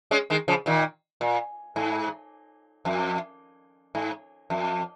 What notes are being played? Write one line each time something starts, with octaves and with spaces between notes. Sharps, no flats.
G#3 C#4
D#3 G#3
C#3 F3
A#2 D#3
A#2
G#2
F2
G#2
F2